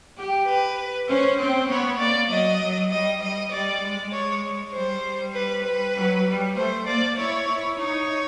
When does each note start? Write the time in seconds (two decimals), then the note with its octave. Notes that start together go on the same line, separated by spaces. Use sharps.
0.17 G4
0.47 B4
1.09 C#4 C5
1.39 C4 C5
1.68 B3 C#5
1.99 A#3 D5
2.30 F#3 D#5
2.60 F#3
2.91 G3 D#5
3.21 G3 D#5
3.51 G3 D5
3.83 G#3
4.12 C#5
4.73 G3 C5
5.34 B4
5.64 B4
5.95 F#3
6.26 G3
6.56 A3 C5
6.86 A#3 D5
7.17 E4 C#5
7.47 E4
7.78 D#4 C#5